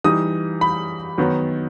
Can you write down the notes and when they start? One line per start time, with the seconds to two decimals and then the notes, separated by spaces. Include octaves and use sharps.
0.04 E3 G3 D#4 D#6
0.61 B5
1.18 D#3 F#3 B3 D#4